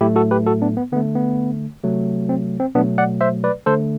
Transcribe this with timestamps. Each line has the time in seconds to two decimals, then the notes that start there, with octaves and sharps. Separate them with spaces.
0.01 A2 F#3 A3 E4 G4
0.16 F#4 A4
0.31 G4 B4
0.47 F#4 A4
0.62 B3 D4
0.77 B3
0.92 D3 B3
0.96 A3
1.15 B3
1.83 C3 F#3 A3
2.29 C4
2.60 C4
2.75 B2 F#3 A3 B3 D4
2.98 D5 F#5
3.21 C5 E5
3.44 B4 D5
3.66 D3 A3 A4 C5